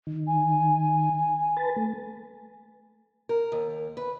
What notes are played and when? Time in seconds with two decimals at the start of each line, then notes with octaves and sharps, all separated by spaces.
0.07 D#3
0.27 G#5
1.57 B4 A5
1.76 A3
3.29 A#4
3.52 D#2
3.97 B4